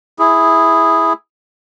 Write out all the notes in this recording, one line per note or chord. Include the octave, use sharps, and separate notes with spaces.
E4 G#4